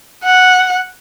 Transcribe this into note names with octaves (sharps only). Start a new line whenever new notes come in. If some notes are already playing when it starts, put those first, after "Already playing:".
F#5